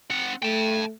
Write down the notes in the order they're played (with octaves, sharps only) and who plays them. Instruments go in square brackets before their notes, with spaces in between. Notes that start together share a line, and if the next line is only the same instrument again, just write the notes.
[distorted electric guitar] C4 F#5
[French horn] A3 [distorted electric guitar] G5 A5